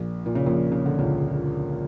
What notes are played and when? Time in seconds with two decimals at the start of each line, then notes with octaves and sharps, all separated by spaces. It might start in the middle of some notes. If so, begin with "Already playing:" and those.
Already playing: A#1 A#2
0.26 A#2
0.35 C#3
0.46 A#1 A#2
0.72 C#3
0.86 D3
0.99 C#2 C#3